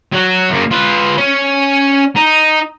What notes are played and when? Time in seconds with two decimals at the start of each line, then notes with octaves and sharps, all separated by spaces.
0.12 F#3 F#4
0.50 F#2 A#3
0.71 F4 B4
1.18 C#4
2.16 D#4